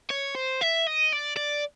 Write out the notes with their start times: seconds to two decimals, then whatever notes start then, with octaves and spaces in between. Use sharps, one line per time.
0.11 C#5
0.35 C5
0.61 E5
0.87 D#5
1.12 D5
1.37 D5